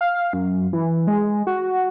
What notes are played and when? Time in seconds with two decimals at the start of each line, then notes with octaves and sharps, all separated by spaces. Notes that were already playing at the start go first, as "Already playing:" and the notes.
0.01 F5
0.33 F#2
0.73 E3
1.07 G#3
1.47 F#4